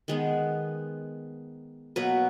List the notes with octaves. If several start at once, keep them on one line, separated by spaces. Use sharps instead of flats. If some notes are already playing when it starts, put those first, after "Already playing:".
D#3 G#3 B3
B2 F#3 A#3 B4